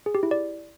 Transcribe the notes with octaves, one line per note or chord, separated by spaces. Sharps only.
G#4
G4
E4
D5